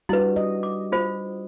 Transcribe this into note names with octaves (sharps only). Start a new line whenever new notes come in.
G3 D4 E4 F#4 B4
D#5
D6
F4 C5